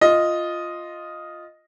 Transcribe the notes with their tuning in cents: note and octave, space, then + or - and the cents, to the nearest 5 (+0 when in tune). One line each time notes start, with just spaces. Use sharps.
F4 +0 D#5 +0